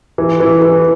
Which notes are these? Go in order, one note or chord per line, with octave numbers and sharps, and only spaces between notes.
E3
E3
E3